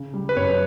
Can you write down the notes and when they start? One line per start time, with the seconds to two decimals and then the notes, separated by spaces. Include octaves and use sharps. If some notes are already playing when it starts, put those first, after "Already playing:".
Already playing: C#3
0.14 G3
0.29 B4
0.36 F#2 C#5